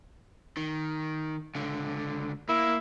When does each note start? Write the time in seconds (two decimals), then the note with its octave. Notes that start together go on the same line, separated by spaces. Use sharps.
0.57 D#3
1.55 C#2 D3
2.49 A#3 E4